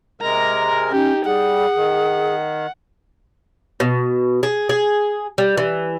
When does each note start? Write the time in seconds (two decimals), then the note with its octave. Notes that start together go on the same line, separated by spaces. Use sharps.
0.21 C3 G#3 A#4 A#5
0.92 C#4 D#4 G4
1.25 G3 G#4 F#5
1.75 D#3
3.80 B2
4.43 G#4
4.69 G#4
5.38 G3
5.57 E3